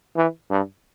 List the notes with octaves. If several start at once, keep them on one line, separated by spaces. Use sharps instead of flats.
E3
G2